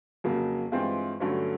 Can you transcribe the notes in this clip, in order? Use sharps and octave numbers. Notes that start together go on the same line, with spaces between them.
F2 C#3 F#3 A#3
G2 E3 G#3 C4 F4
G2 D3 F#3 A3 C#4